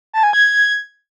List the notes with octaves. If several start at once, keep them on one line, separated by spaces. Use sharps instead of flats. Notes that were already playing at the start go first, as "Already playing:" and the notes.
A5
G#5
G#6